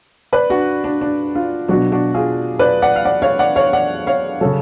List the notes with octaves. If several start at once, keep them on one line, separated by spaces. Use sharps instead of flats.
B4 D5
D4 F#4
D4
D4
F4
B2 F#3 D4 F#4
D4 F#4
F4 G#4
B4 D5
D5 F#5
F5
D5 F#5
C#5 F5
D5 F#5
C#5 F5
D5 F#5
C#5 F5
C#3 F#3 A4 C#5